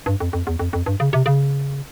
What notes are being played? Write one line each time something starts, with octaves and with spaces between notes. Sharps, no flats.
G2
F2
F2
E2
F2
F2
G2
C#3
C3
C#3